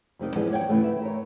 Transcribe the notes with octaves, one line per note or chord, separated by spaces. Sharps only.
F2 C3 D#3 D#5
E3 F3 G#3 B3 D4 C5
C#5 F#5 G5
C#3 E3 A3
B4 E5
A#4 C#5